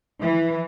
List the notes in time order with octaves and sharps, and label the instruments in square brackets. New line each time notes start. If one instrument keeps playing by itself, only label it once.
[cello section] E3